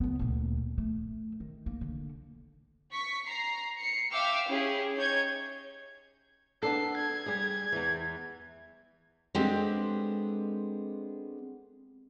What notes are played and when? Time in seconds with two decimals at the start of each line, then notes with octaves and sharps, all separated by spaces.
0.01 C#2 B3
0.19 D2 A#2
0.78 A3
1.40 D#3
1.66 A#3
1.81 D3
2.92 C#6 B6
3.26 A#5 C7
3.77 C7 C#7
4.11 E5 F5 G5 D6 E6 F6
4.47 C#4 E4 G4 G#4
4.96 D#4 C#5 G6 G#6
6.63 B3 D4 A4 C7
6.96 G#6
7.26 G3 G#4
7.72 E2 E3
9.35 G#3 B3 C4 D4 G4 A4